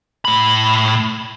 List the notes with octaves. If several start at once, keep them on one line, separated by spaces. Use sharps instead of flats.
A2 B5